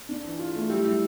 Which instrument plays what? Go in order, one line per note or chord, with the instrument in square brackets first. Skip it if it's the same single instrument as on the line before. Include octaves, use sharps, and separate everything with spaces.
[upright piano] D4
E3
F4
A3
[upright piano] G3 [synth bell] E4 G4
[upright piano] G3 [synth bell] E4 G4